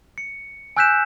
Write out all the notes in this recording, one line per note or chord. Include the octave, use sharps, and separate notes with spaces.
C#7
G#5 E6 F#6 G6 B6 E7